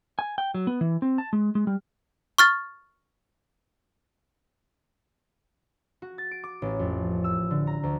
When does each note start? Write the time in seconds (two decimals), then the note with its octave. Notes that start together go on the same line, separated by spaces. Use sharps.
0.19 G#5
0.38 G5
0.54 F#3
0.67 B3
0.81 E3
1.02 C4
1.18 A5
1.33 G#3
1.55 G#3
1.67 G3
2.38 C#6 F6 A6
6.02 F#4
6.18 A6
6.31 D7
6.44 D6
6.62 A1
6.79 F2
7.24 E6
7.50 D3
7.67 A#5
7.83 D2